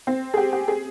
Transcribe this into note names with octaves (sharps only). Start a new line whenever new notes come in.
C4
G#4
G4
G4
G#4